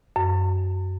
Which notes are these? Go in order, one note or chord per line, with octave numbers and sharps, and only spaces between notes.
F#2